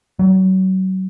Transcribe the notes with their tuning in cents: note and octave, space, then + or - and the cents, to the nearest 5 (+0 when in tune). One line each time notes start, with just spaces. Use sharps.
F#3 +30